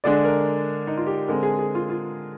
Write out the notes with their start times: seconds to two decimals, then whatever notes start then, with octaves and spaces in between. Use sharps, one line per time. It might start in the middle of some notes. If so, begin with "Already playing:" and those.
0.04 D3 G#3 D4 D5
0.24 A#4
0.87 D#4
0.97 F4
1.07 G4
1.28 D3 G#3 C4 A#4
1.43 G#4
1.59 G#4
1.75 F4
1.90 F4